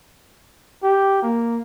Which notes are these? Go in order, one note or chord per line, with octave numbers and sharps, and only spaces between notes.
G4
A#3